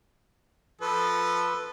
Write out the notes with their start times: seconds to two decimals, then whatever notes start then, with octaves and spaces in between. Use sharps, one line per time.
0.81 F3 A4 B4